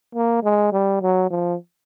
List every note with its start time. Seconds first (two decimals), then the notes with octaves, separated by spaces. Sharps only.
0.15 A#3
0.43 G#3
0.73 G3
1.01 F#3
1.30 F3